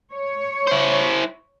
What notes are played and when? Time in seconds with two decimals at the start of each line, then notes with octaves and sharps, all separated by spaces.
0.13 C#5
0.67 E4 C5